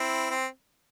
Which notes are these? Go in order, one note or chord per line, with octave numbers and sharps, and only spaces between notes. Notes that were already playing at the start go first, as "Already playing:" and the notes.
Already playing: C4 E4
C4